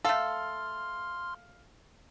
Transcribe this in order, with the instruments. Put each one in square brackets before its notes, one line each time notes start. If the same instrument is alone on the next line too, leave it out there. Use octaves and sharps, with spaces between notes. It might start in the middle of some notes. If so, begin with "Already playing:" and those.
[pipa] A3 A4 [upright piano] F5 [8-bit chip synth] C6 F6